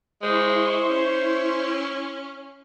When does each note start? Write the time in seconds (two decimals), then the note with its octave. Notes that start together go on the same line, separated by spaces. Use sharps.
0.22 G#3 E4 C5 C6 C#6
0.89 C#4